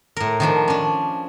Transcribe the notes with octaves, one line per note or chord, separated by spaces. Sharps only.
A2 A#4
D#3 F3 D4
C#4 D4